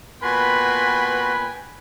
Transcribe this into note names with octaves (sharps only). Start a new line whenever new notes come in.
A#2 B3 F#4 B4 G5 G#5 B5 C6